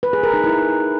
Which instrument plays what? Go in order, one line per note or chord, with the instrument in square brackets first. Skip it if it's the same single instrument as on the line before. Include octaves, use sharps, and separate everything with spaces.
[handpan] B4
G#4
A#4
D#4
E4